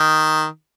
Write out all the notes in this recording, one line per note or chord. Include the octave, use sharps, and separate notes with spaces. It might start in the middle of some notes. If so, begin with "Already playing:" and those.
Already playing: D#3